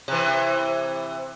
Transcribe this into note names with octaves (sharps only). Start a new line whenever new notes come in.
C3 E3